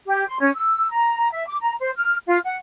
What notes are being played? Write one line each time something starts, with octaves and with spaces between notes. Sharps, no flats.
G4
C6
C#4
E6
A#5
E5
D6
A#5
C5
F6
F4
F#5